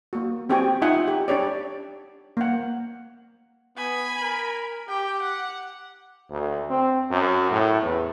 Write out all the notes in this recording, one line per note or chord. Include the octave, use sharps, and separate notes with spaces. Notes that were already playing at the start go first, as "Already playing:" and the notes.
A#3 F#4
C4 F#4 G4 G5 G#5
D#4 F4 E5 F#5 G#5
G4
D4 G4 C#5 D5
A#3 F#5
B3 G#5 B5
A#4
G4 G5
F#5
D2
C4
F#2
A2
E2